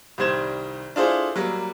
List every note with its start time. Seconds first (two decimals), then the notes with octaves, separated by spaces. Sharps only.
0.18 C2 D#3 G3 C5 G#6 E7
0.96 D4 E4 F4 G#4 A4 C5
1.36 F#3 G3 A#3